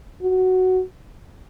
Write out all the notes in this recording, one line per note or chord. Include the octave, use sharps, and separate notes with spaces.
F#4